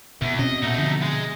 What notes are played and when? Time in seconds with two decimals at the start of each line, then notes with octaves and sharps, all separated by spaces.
0.22 E2 B2 B3
0.39 B2 C4 C#4 D#5
0.63 A#2 A3 D#4 F#5 G6
0.78 D3 F3
1.02 G#3